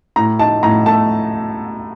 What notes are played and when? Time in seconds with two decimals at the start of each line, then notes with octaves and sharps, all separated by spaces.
0.16 A2 A#5
0.39 D#4 A5
0.63 A2 A#5
0.86 A3 A5